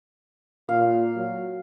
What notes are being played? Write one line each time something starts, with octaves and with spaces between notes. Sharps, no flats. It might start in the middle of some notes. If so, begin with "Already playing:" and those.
A#2 F5
F#3